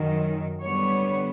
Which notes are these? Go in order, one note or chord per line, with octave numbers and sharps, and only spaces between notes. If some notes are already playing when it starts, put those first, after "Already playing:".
Already playing: F#2 D#3 F#3
D3 G3 B3 C#5